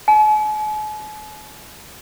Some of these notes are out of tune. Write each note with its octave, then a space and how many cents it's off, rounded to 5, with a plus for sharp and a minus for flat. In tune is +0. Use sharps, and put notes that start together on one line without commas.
G#5 +45